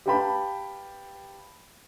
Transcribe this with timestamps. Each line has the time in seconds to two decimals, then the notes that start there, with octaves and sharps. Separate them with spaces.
0.06 G4 B4 F5 G5 A5 B5